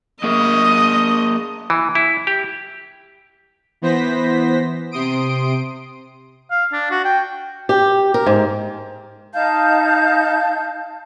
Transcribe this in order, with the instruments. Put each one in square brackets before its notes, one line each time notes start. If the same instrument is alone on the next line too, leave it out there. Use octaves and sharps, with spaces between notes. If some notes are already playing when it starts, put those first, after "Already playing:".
[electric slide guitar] A#3 G#4 A#4 [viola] D#5
[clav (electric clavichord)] E3
E4
G4
[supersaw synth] E3 B3 C5 A#6 B6
C3 C6 D#6 D7
[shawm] F5
D4
F#4
G5
[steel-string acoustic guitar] G4
A#4
G#2
[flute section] D#4 F5 A5 G6